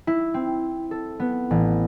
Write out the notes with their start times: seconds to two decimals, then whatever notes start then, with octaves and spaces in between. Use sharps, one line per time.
0.07 E4
0.34 C4
0.91 A4
1.20 B3
1.51 A1